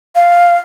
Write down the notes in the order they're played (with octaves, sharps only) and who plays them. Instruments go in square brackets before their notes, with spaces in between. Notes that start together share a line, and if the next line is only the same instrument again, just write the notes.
[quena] F5